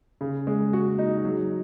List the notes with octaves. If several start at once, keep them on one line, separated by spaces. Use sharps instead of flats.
C#3
G#3
F#4
D#4
F#3